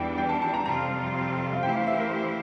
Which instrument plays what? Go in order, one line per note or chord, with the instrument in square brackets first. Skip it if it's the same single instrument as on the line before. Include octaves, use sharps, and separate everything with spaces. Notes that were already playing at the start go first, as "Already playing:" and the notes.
Already playing: [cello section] E2 E3 G3 D4 [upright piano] G5
[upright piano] G5
A5
A5
A#5
[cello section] F2 C3 G3 C4 F4 [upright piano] A#5
[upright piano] F5
[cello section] E3 A3 E4 G4 C5 [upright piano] G5
[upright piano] F5
E5
A#4